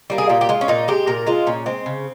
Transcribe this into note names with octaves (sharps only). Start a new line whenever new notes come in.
G3 A#3
G#4
A#2 G4
G4
G#3 F4
C#4
A#2 D#4
G#3 G4
A#2 A#4
G#3 F4
A#2 C#4
G#3 C4
C#3